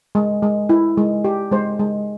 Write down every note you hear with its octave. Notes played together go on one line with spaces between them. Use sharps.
G#3
G#3
E4
G#3
G4
G#3 C5
G#3